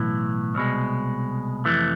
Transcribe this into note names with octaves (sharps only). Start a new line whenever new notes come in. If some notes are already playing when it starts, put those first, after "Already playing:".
Already playing: B1 A2 E3
C2 B2 G#3
F2 C3 E3 A3